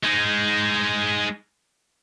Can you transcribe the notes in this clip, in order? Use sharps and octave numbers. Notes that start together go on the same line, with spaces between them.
G#3 D#4